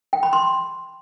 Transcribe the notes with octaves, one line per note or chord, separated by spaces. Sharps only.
G5
B5
C6